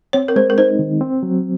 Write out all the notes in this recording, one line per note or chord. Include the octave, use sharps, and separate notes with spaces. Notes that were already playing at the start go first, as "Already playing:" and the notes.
C4 C#5
A#4
G#3 C5
A#4
D#4 C5
D#3
C4
F#3